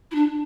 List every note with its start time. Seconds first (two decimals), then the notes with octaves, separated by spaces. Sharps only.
0.11 E4
0.15 D4